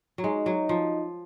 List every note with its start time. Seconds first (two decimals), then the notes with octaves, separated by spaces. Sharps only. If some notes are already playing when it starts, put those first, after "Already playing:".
0.18 F#3
0.24 G#3 D#4
0.46 F#3
0.69 F3